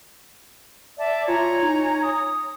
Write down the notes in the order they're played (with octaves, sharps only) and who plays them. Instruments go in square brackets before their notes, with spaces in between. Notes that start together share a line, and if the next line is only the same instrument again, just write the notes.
[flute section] D5 E5 A5
[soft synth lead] F4 [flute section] C#5 G#5 A#5
[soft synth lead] D#4
D#6